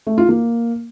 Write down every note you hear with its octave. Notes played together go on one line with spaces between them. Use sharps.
A3
F4
A#3